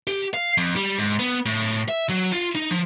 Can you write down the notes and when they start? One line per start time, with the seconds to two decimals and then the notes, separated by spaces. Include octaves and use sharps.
0.07 G4
0.34 F5
0.58 F2
0.76 G3
0.99 G#2
1.19 B3
1.46 A2
1.89 E5
2.09 F#3
2.32 F4
2.55 D#4
2.71 F3